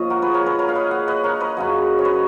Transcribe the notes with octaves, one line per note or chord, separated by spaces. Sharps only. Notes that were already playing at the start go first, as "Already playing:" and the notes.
Already playing: A#2 F3 C#5 D#5
F#4 A#4
G#4 B4
A#4 C#5
G#4 B4
A#4 C#5
F5
B4 D#5
D#5 F#5
B4 D#5
A#4 C#5
B4 D#5
F#2 C#3 F#3
C#5
B4 D#5